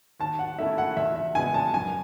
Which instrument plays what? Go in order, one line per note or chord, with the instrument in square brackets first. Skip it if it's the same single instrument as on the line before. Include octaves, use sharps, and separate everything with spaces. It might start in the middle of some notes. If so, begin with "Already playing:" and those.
[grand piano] D#2 [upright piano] A5
[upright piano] F#5
[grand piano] D#3 A3 C#4 E4 [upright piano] E5
[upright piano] F#5
[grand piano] E2 [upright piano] E5
[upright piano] E5
[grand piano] C#3 G#3 B3 D#4 [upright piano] G#5
[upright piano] A5
[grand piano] F#2 [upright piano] G#5